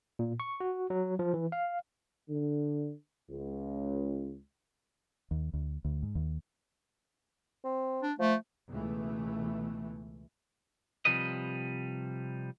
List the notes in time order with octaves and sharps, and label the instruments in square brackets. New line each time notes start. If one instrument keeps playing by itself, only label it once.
[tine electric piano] A#2
C#6
F#4
F#3
F3
E3
F5
[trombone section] D3
C#2
[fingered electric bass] D#2
D2
D2
G#2
D#2
[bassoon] C4
[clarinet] D4
[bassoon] F3 [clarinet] A3
[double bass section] C#2 B2 E3 A3
[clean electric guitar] C3 D#3 F3 G3 B4 D#5